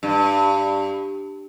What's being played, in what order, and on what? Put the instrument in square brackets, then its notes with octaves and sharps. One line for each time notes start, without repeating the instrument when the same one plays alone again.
[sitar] G2